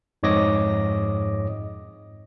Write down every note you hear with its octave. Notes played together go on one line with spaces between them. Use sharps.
F2 G#2 C#5 D#5 D6 A#6